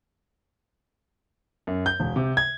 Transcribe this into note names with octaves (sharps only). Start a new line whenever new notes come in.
F#2
G6
E1
C3
G#6